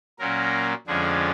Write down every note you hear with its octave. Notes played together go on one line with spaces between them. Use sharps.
A#2 F#3 A#3 C#4 A#4
F2 D3 F3 G#3 C#4 G#4